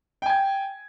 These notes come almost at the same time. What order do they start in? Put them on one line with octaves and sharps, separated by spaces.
G5 G#5 G#6